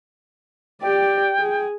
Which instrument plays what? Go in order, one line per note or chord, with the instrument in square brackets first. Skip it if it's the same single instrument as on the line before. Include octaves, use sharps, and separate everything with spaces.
[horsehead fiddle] G4 D5 [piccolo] G5
[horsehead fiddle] G#4